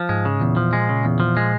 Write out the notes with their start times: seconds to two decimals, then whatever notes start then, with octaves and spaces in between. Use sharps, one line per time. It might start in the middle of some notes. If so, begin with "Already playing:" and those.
Already playing: F3
0.09 G#2 G#3
0.25 C#3
0.40 E2 A#2
0.57 F3
0.73 G#3
0.89 C#3
1.05 E2
1.20 F3
1.37 G#3